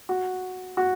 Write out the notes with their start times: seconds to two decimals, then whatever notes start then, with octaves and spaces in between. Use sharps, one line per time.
0.09 F#4
0.77 F#4